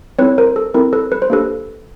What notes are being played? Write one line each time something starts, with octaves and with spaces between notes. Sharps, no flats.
C4 E4 A4 B4 C#5
A#4 C5
A4
C4 E4 A4 A#4
A4 B4
B4
C5
A#3 D4 G4 A4 B4